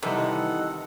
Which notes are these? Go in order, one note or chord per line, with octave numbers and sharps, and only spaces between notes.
C3 D#3 E3 G3 A4 D#5 F#5